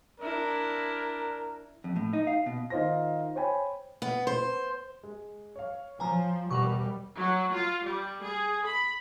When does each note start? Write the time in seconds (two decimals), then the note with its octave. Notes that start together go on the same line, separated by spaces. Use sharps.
0.20 D4 E4 A#4
1.84 F2
1.96 A2
2.13 D#4
2.27 F5
2.46 B2
2.70 D#3 D#4 F4 C5 A#6
3.35 C5 C#5 G5 G#5 B5
4.02 B3
4.27 C5
5.03 G#3
5.56 C#5 F5
6.00 F3 G#5 A#5
6.51 E1 B2 G3 A#4 F#5 C#6
7.16 F#3
7.53 F4
7.85 G3
8.22 G#4
8.65 B5